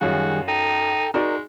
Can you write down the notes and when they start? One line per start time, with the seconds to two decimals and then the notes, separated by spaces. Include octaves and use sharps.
0.01 F#2 D#3 G3 F4 F#4 G#4
0.48 D#4 A4 G5
1.14 G#3 D#4 F#4 A#4 D5